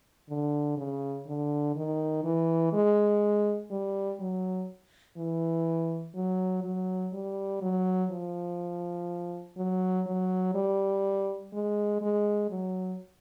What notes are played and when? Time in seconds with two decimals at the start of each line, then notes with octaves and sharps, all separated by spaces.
0.29 D3
0.77 C#3
1.27 D3
1.76 D#3
2.24 E3
2.73 G#3
3.71 G3
4.20 F#3
5.17 E3
6.15 F#3
6.64 F#3
7.13 G3
7.62 F#3
8.11 F3
9.57 F#3
10.06 F#3
10.55 G3
11.53 G#3
12.02 G#3
12.51 F#3